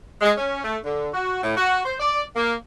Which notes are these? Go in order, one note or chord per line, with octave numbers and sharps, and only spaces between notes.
G#3
C#4
A3
D3
F#4
A2
F#4
C5
D5
A#3